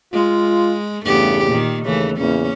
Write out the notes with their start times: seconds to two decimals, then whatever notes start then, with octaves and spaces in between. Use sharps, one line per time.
0.13 G#3 F4
1.05 E2 G2 C#3 A3 B3 G4
1.47 A#2 D#3
1.85 D#2 C#3 E3 A3
2.16 E2 A#2 C#3 A#3 C#4